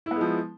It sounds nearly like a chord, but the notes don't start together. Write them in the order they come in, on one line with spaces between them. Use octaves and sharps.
E4 B3 G#3 F3